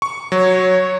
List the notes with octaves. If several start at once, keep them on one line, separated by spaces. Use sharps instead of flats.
C#6
F#3 C#5